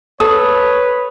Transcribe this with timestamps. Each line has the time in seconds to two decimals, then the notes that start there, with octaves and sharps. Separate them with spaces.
0.20 A4 B4 C#5 D#6